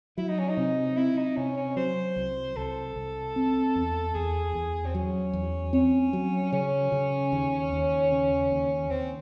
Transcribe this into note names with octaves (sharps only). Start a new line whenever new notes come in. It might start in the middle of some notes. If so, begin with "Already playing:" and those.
F#3 E4
D#4
C#4
D#4
C3
C4 E4
D#4
C3 C#4
C#4
F#3 C5
C2
C2 A4
C2
C4
E2
E2 G#4
E2
C4
F#3 C#4
E2
C4 C#4
F#3
C#3 C#4
C#3
D#2
D#2
C#3
D#2
D#2 C4